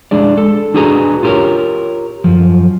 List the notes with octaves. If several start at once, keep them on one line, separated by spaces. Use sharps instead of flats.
G#3 D4 G#4 D5
A4
D4 F#4 G#4 B4 A#5
F4 G4 A#4 C#5
F#2 F3